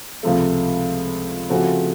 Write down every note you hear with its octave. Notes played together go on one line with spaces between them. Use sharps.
C#2 C3 F3 A3
C#3 F3 A3 C4 F#4